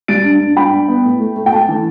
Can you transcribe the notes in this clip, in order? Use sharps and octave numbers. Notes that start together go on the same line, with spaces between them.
G3 A6 D7
G2
G2
G2 G5 B5
G2
B3
A2
A3
A3
G5
A3 A5
E3